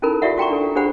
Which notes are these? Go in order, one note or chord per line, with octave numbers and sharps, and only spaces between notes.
C#4 D#4 E4 A4 A#4 B5
F4 G4 D5 E5 F#5
F#4 G5 A#5 C#6
D4 A4
D4 G4 G#4 C5 F#5 B5